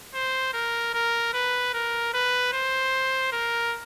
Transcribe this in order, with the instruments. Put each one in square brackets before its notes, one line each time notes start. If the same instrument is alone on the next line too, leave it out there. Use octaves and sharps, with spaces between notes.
[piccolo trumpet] C5
A#4
A#4
B4
A#4
B4
C5
A#4